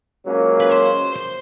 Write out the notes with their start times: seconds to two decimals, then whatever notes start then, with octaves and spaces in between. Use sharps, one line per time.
0.24 C#2 C#3 F#3 A#3 C#4
0.60 B4
0.70 C5
1.16 C5